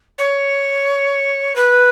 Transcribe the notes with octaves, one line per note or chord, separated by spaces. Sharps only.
C#5
B4